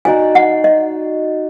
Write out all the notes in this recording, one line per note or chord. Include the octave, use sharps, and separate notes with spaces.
D#4 F#4 D5 G#5
F#5
D#5